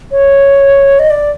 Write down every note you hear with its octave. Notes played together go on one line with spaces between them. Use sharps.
C#5
D#5
D5